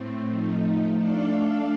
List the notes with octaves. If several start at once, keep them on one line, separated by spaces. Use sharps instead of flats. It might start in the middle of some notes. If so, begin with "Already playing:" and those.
Already playing: A2 A3 C4
F3 A3 D#4
A3 D4 A4 D5 F5